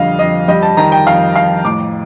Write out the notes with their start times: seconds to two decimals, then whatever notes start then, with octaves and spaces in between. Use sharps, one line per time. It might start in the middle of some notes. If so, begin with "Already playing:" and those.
Already playing: F2 D3 G3 D#5 F5
0.19 F2 D#5
0.48 G3 D#5
0.63 A5
0.77 D#3 A#5
0.92 G5
1.06 F2 F5
1.35 F2 F5
1.65 A2 D6